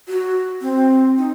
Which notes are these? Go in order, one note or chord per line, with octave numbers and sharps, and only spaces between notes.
F#4
C4
D#4